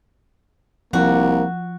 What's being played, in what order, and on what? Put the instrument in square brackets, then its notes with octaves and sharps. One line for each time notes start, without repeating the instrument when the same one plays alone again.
[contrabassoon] C2 [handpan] F3 [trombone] A#3 [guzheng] F#4